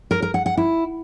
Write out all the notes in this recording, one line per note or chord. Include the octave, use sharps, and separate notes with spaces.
A#4
A#4
F#5
F#5
E4